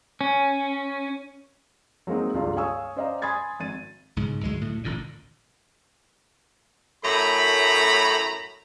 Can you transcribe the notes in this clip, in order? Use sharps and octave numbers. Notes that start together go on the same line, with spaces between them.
C#4
F#3 G#3 A#3 C4 D#4
D#1 C#2 G2 F4 D5 A#5
C#5 F5 G#5 C#6 D#6 E6
C#4 C5 D5 D#5 F5 A#5
G#5 B5 C6 D#6 G#6 A6
G#1 A6 D#7
B1 G#2 C#3
D2 F#3 G#3
D2 A2 A3
D#1 A1 A#2 D3
F#2 A2 A3 A#5 B5